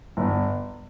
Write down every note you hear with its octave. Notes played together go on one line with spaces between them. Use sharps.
G1